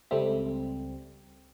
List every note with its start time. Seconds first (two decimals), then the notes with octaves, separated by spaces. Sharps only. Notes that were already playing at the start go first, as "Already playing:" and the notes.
0.11 C#2 G3 C4 A4 E5